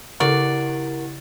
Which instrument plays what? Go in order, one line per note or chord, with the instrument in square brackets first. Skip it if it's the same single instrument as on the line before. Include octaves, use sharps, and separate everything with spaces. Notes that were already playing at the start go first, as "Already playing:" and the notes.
[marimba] C#3 [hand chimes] E4 G4 F#5 [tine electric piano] A#4 [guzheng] D5